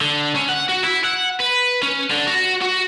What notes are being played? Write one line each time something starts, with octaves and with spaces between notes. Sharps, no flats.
D3
C#4
F#5
F#4
E4
F#5
B4
C#4
D3
F#4
F#4